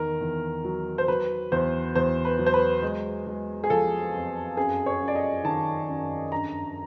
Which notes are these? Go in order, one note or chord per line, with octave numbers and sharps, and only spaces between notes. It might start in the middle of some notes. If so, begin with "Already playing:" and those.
Already playing: E2 D#3 A#4
E2
F#3
C5
F#3 B4
E2 C5
E2 C5
B4
F#3
C5
B4
G#3
G#3
G#4
F3 A4
F2
F#2 G#4
C#5
F#2
D5
D#5
D#3 A5
F#2
G2 A#5